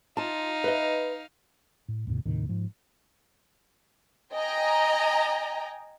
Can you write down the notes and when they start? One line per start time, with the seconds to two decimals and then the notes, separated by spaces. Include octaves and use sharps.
0.17 D#4 F4 F5 A5
0.64 B4 D#5
1.88 A2
2.07 D#2 G#2 C3
2.25 D#2 A2 C3 D#3
2.49 G#2 F3
4.33 D#5 G5 G#5 A#5